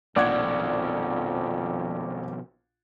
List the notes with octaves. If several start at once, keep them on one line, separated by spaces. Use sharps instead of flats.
A#1 F2 B2 D#3 F3 D5 F#5 G#6